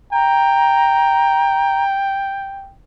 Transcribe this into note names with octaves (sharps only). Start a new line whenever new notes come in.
G5 A#5